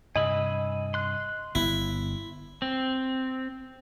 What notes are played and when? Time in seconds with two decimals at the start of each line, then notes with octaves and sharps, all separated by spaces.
0.16 G2 C3 D#5 G#5 B5 E6
0.94 C6 F#6
1.55 G1 B3 E4
2.62 C4